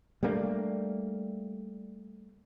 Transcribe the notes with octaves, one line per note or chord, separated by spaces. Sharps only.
G3 A3 A#3 D4